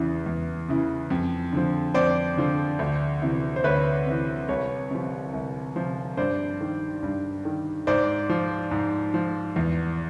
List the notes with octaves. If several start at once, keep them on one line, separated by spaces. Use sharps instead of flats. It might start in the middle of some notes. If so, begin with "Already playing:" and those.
Already playing: E2 C#3 E3
E2
C#3 E3
F2
D3 F3
F2 C5 D5
D3 F3
D2
C3 E3
C5
D2 B4 C#5
C3 E3
C2 B4 C#5
C3 F3
C2
C3 F3
G2 C5 D5
D#3
G2
D#3
G#2 C5 D5
F3
G#2
F3
E2